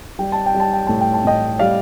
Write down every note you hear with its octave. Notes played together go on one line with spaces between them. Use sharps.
G3 G5
A5
G5
G3
A5
G5
A2 A5
G5
A5
A2 D#5 G5
G3 D5 F5